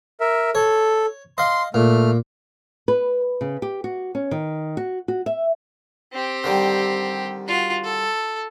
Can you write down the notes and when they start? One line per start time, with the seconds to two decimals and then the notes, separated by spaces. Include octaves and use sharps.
0.21 A#4 E5
0.55 A4 C#5
1.38 D#5 F5 C6
1.74 A#2 A3 F6
2.88 B4
3.41 C#3
3.62 G4
3.84 F#4
4.15 C#4
4.31 D#3
4.77 F#4
5.08 F#4
5.26 E5
6.13 C4 G4
6.44 D3 D#3 G3
7.47 F4 F#4
7.84 A4